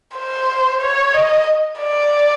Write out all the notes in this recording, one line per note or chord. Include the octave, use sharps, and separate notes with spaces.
C5
C#5
D#5
D5